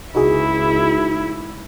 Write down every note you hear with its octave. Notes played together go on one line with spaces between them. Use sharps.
C#2 D#4 E4 F#4 G#4